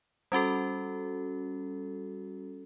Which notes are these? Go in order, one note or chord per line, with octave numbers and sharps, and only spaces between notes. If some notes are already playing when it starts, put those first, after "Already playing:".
G3 C#4 F#4 A4